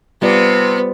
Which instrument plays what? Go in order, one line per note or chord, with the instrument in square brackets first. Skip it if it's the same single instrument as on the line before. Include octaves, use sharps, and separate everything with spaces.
[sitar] C3 [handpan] G3 F4 D5 [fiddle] B3